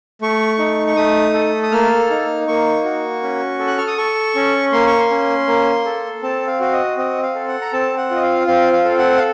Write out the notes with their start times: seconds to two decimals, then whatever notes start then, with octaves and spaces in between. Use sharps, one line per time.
0.22 A3 C#6
0.59 D#4
0.87 C#6
0.96 A3 D#6
1.34 A4
1.63 D#6
1.72 A#3 F6
2.10 D#4
2.48 A#3 C#6
2.84 F#4
3.23 C#4
3.59 A4
3.67 F#6
3.78 F6
3.87 D#6
3.98 A4 C#6
4.35 C#4
4.72 A#3 C6
4.86 C#6
4.99 C6
5.10 C#4
5.47 A#3
5.86 A4
6.23 C4 A5
6.47 F5
6.60 F#4 F5
6.73 D#5
6.97 C4 D#5
7.23 F5
7.35 A4
7.48 F#5
7.61 A#5
7.73 C4 A5
7.97 F#5
8.11 F4 D#5
8.23 F5
8.47 C4 F5
8.73 F5
8.85 A4
8.99 F#5
9.18 F5